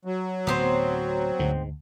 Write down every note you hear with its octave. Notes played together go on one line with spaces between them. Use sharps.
F#3
D1 B3 C4 C5
D2 G#2